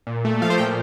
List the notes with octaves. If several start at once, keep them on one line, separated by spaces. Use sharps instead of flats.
A#2
A3
F3 F5
C5
A#2 G5